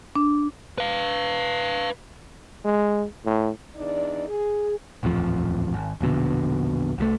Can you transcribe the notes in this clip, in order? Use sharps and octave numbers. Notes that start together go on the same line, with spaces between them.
D4
B4 F5
G#3
A2
E2 D4 D#4 D5
G#4
D#1 A1 F2 F3
G#1
E1 A#1 B2 D3
C2 F3 A3